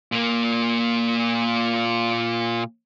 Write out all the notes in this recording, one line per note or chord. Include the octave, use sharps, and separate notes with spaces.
A#2 A#3